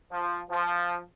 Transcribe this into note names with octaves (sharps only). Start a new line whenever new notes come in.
F3
F3